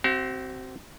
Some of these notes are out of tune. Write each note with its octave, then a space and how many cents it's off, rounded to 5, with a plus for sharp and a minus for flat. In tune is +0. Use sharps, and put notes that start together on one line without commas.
C4 +0 F#4 +45 F5 +0